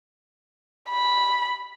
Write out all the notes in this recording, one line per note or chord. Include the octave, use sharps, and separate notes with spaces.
B5